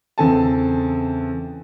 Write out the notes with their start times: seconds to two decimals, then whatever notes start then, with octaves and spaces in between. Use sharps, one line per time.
0.18 E2 C#3 C4 A4 G#5 A5